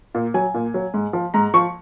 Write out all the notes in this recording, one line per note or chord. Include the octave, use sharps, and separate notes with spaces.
A#2
F#3 G#5
A#2
F#3
G#2
F3
G#2 A#5
F3 C#6